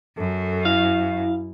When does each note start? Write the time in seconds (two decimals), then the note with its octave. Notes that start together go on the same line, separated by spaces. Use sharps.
0.17 F#2 A4
0.65 E4 F5